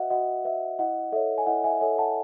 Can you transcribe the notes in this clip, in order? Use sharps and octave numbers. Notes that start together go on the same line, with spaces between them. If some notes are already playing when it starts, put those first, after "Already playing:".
Already playing: F#4 B4 D#5 E5 F#5
F#4 D#5 F#5
B4 E5
E4 D#5 F#5
A4 C#5 E5
G#5
E4 D#5 F#5
E5 G#5
A4 C#5 E5 G#5
F#5 A5